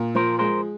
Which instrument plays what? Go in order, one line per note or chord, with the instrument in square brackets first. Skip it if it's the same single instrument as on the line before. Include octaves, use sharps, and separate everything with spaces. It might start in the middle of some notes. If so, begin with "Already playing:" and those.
Already playing: [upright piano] A#2
[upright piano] F3 [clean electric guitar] A#4 C5
[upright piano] G#3 [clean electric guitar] A#4 C5